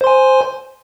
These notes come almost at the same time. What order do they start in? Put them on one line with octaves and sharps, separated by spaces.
C5 C6 G#5